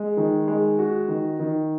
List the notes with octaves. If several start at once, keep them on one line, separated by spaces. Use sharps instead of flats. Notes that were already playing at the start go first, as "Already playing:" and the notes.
Already playing: G#3
D#3
G#3
F#4
D#3
D#3